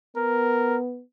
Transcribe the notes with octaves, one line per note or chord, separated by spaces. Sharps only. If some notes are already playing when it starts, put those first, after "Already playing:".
B3 A#4